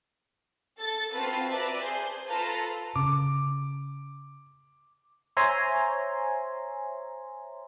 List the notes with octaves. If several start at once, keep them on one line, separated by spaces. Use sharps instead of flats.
A4 A6
C4 F4 F#4 B4 A5
B4 D5 E5 A5 A#5
G#4 C5 G6
F4 A4 B4 A5 A#5 C6
C#3 D6
C5 C#5 E5 G#5 A#5 C6